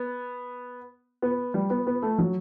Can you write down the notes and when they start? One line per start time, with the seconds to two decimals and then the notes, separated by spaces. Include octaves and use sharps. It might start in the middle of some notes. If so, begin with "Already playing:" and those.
Already playing: B3
1.22 B3
1.54 G3
1.70 B3
1.87 B3
2.02 A3
2.18 F#3